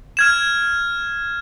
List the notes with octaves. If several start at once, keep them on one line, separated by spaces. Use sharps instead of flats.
F6 G#6 E7